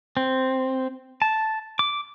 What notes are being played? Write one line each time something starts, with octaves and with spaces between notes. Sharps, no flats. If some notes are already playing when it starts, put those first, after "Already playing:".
C4
A5
D6